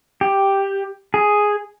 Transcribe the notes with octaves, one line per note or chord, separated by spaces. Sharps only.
G4
G#4